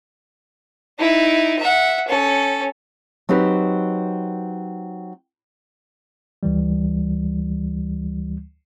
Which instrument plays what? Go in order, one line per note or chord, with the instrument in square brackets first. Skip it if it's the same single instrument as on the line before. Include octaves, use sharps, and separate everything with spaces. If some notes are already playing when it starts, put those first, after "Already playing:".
[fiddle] D#4 E4
E5 F#5
C#4 A4
[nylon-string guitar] F#3 C4 D#4 G4 B4
[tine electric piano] D2 E3 G3